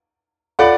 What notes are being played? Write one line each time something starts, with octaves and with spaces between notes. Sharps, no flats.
F4 A4 C#5 D5 F5 F#5 G#5